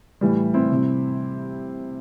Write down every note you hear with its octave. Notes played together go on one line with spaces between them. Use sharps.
A2 E3 G3
C4 E4
C3 G3